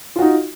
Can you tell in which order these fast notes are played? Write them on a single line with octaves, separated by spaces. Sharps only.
F4 F#4 D#4